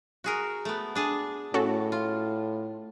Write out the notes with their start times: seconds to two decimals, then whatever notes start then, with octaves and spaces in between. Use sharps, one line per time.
0.24 F#4 G#4 A#4
0.65 A3 B3
0.95 D4 G#4 A5
1.54 A2 C#4 F#4 A4
1.92 F4